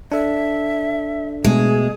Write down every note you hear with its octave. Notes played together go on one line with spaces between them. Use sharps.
D4 A4 E5
B2 G#3 A3 G#4